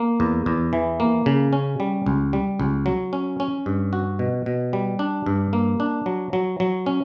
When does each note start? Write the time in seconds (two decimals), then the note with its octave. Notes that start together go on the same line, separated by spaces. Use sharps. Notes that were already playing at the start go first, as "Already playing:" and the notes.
Already playing: A#3
0.20 E2
0.46 E2
0.73 E3
1.00 A#3
1.26 C#3
1.53 C#4
1.80 G3
2.06 C#2
2.33 G3
2.60 C#2
2.86 F#3
3.13 C#4
3.40 C#4
3.66 G2
3.93 F#4
4.19 B2
4.46 B2
4.73 G3
4.99 D4
5.26 G2
5.53 A#3
5.80 D4
6.06 F#3
6.33 F#3
6.60 F#3
6.86 C#4